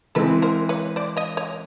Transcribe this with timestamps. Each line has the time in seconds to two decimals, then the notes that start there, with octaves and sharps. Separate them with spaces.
0.15 E3 G#3 C4 A4 B4
0.42 A#4 C5
0.69 B4 C#5
0.96 C5 D5
1.16 C#5 D#5
1.37 C#5 D#5